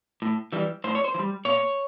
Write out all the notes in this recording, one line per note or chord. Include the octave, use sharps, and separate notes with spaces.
A2
E3 G3
A2 C5
C#5
C5
E3
G3
A#2 C#5